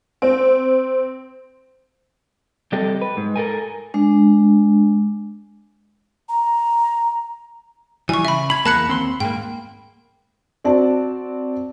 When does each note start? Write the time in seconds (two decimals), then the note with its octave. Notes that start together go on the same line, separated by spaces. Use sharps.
0.22 C4
2.72 C3 G3 G4 A4 D#5 G5
3.02 B4
3.17 G#2
3.36 A4 A#4 G#5
3.94 G#3 D4
6.29 A#5
8.09 E3 G3 G#5 C#6
8.25 C#3 E5 B5
8.50 B5 G#6 F#7
8.66 E2 A#3 A5 F#6 C#7
8.88 D#2 C4 C6
9.20 G#2 A#3 G5
10.65 C4 F#4 D5 A5